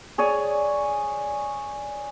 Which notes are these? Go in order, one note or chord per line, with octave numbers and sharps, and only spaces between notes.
G#4 C#5 D5 G#5